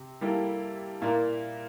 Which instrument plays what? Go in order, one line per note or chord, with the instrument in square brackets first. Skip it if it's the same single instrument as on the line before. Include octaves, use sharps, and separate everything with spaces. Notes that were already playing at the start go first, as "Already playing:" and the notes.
Already playing: [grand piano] C3
[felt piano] G3 A#3 E4 A4
[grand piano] A#2 [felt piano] A#3 E4 A#4 D5